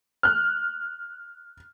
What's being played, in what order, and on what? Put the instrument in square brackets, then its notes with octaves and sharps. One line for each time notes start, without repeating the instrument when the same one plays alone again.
[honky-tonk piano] F6 F#6